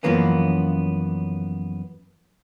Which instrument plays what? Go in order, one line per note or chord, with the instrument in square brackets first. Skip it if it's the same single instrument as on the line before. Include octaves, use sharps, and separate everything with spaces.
[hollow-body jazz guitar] F#2 E3 F3 A#3 B3 C#4